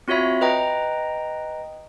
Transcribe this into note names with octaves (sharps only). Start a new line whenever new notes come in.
C4 F4 F#4 C#5 E5 B5
B4 D#5 G5 A#5